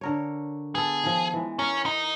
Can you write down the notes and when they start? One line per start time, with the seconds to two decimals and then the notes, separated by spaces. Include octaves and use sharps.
0.01 D3 A#4 C#5
0.75 B3 G#4 A4
1.04 D#3 F3
1.33 E3 G#3
1.59 C#4 A#4
1.86 D#4